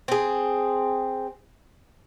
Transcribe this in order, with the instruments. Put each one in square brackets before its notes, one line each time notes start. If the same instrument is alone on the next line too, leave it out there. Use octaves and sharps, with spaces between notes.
[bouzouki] C4 G#4